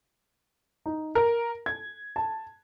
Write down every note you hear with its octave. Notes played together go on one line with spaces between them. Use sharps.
D#4
A#4
G#6
A5